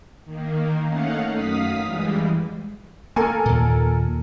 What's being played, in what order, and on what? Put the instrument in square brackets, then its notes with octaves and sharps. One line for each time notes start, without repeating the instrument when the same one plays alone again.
[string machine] D#3 A#3
A3 C#4 D#4 F5 F#5
F#2 F5 D#6 B6
E3 G3 G#3
[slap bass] A#3 [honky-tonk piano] A4 A#4 G#5
[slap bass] D#2 A#2